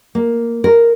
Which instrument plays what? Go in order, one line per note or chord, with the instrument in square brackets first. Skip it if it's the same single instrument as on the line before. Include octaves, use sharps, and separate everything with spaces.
[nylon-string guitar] A#3
A#4